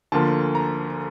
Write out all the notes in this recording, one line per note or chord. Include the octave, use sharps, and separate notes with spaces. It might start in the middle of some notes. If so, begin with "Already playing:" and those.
D2 D3 F3 A#3 A5
A#5